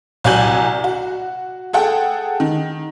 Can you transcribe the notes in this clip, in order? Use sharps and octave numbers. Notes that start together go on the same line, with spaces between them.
C2 F#3 D5 G#5 G6 F#7
F#4
G#4 A4 F#5 G5
D#3